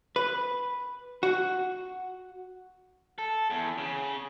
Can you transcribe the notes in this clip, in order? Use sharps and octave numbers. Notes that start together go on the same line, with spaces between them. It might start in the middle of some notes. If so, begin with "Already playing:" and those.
B4
F#4
A4
E2
C#3